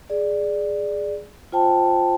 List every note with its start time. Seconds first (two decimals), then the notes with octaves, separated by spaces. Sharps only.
0.10 G#4 D5
1.52 F4 C5 G5 A5